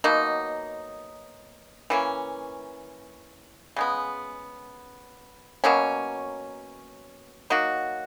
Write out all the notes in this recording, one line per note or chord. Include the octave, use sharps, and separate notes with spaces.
B2 F#3 A#3 D#4
E3 A#3 C#4
C#3 G#3 B3
B2 F#3 A#3 C#4
F#3 A#3 D#4 F#4